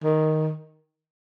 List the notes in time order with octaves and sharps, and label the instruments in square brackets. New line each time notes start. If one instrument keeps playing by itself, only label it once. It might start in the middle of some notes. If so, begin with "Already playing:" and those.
[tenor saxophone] D#3